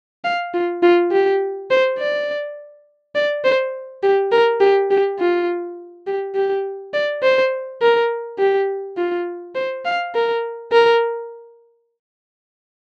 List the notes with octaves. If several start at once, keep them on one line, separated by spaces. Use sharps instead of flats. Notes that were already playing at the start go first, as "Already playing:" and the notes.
F5
F4
F4
G4
C5
D5
D5
C5
G4
A#4
G4
G4
F4
G4
G4
D5
C5
A#4
G4
F4
C5
F5
A#4
A#4